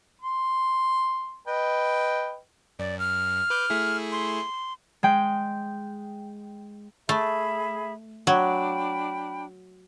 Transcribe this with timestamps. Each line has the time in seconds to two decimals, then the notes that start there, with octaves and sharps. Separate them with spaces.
0.22 C6
1.47 B4 D#5 G5
2.79 F#2 D5
2.99 F6
3.50 B4 D6 G6
3.70 A3 E4 G#4
4.12 C6
5.03 G#3 G5
7.09 A3 G#4 E5 B5
8.27 F#3 D4 G5 B5